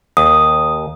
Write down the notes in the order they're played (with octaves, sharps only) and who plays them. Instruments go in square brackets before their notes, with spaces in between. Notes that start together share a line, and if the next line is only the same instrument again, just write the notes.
[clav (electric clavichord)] D#2 [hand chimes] D#6